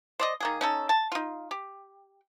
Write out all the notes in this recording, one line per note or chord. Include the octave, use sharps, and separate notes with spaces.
C5 D5 D#5
D#3 A#3 G#4
C#4 D#4 A4
A5
D#4 F4
G4